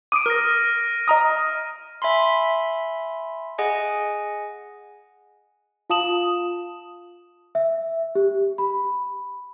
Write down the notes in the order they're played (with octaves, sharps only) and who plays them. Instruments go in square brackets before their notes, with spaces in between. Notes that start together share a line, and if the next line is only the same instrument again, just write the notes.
[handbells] D6 D#6 [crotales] D7 D#7
[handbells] A#4 [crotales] F6 A#6
[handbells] D#5 A#5 D#6
E5 G#5 B5 C6
G#4 D#5 F#5 G#5
[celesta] F4 F5 A5 D#6 E7 F#7
E5
G4
B5